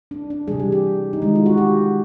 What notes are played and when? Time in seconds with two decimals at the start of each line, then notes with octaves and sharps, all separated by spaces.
0.11 D4
0.30 D4
0.48 C3 E3 G3 G#4
0.60 G4
0.72 G4
1.13 D#4
1.22 D#3 G#3 E4
1.36 F4
1.46 F#4
1.58 G4